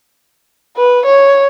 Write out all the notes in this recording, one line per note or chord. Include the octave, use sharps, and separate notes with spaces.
B4
C#5